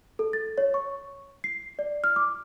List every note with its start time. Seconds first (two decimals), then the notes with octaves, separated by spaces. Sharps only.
0.19 A4
0.33 A6
0.58 C#5
0.74 C#6
1.44 C7
1.79 D5
2.04 F6
2.16 D6